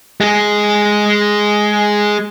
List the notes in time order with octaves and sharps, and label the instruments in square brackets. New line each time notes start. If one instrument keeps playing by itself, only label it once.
[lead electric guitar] G#3 G#4